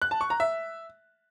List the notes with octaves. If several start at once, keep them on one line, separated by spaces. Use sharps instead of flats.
F#6
A5
C#6
A#5
E5